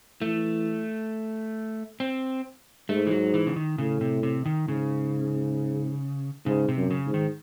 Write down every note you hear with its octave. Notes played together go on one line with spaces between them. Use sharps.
E3 A3
C4
G#2 A3
E3
F#3
E3
C#3
D#3
A2 C#3
C3
C3
D#3
G#2 C#3
G#2 C#3
C3
F#2
C#3
G#2
D#3